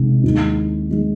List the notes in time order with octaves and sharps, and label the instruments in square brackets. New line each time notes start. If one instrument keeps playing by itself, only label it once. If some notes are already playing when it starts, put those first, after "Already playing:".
Already playing: [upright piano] C2 C3 D#3 G#3
D#2 D#3 G#3
D#3 G#3